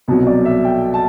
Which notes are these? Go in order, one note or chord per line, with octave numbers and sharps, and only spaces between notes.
C2 B2 F#3
D5
E5
G5
A5